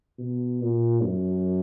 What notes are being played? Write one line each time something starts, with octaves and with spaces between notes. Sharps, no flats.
B2
A#2
F#2